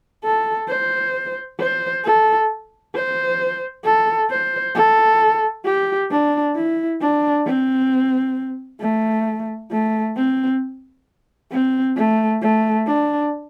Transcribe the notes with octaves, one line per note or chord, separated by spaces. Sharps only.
A4
C5
C5
A4
C5
A4
C5
A4
G4
D4
E4
D4
C4
A3
A3
C4
C4
A3
A3
D4